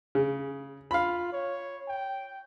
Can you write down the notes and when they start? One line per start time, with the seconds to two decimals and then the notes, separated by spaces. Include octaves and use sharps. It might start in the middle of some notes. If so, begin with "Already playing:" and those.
0.15 C#3
0.91 F4 F5 B5
1.32 C#5
1.88 G5